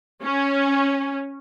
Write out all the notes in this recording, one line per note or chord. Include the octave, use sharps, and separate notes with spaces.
C#4